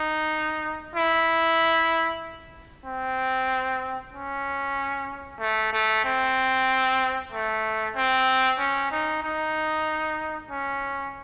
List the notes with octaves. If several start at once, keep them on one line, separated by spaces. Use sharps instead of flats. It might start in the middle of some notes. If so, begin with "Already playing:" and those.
Already playing: D#4
E4
C4
C#4
A3
A3
C4
A3
C4
C#4
D#4
D#4
C#4